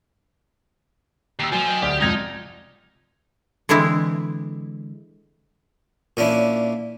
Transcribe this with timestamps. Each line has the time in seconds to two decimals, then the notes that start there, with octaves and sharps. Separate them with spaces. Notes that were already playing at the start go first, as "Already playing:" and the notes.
1.39 D#2 D6 E6 C7
1.52 F3 F#3 F#4 G#5
1.67 D#5 G5
1.82 D2 G4 D5 D#6 F6
2.01 F2 G#3 D#4 G#6 A#6
3.69 D3 E3 G#3 C4 E4
6.17 A#2 C#4 D4 E4